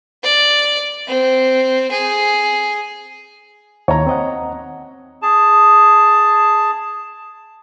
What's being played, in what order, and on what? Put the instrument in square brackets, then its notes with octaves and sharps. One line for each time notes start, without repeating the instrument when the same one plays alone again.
[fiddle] D5
C4
G#4
[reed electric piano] D#2 [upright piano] C#5 A#5
[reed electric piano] C4 D#5 F#5
[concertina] G#4 A5